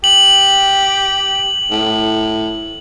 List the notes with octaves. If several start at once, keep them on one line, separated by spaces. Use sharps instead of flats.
G4 F#7
A2